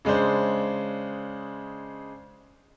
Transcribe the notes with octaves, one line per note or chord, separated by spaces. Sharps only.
C#3 G#3 D4 C5